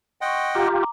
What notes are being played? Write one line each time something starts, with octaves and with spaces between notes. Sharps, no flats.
D#5 F#5 G5 C6 C#6
F4 G4 A#5 D6